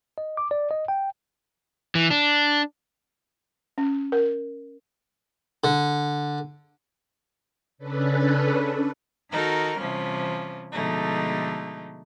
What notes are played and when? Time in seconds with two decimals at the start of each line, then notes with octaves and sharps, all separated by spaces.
0.18 D#5
0.37 D6
0.51 D5
0.71 D#5
0.88 G5
1.95 E3
2.11 D4
3.78 C#4
4.12 A#4
5.64 D3
7.78 C#3 C#4 D4 A4 B4
9.31 D#3 D#4 F#4 A4 A#4 F6
9.77 C3 E3 F3 G3 C#4
10.72 B2 D3 F3 G#3 A3 D#4